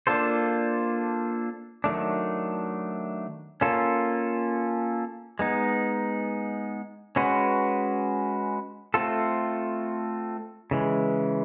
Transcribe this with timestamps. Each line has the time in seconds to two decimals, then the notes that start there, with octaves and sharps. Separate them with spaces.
0.07 A#3 D4 F4 A4 C5
1.84 D#3 F#3 A3 D4
3.61 A#3 C#4 F4 A4
5.39 G#3 B3 D#4
7.16 G#3 C#4 F#4 B4
8.94 A3 C4 F4 A4
10.71 C#3 E3 G#3